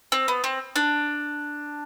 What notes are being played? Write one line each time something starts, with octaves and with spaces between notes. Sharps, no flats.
C4
B3
C4
D4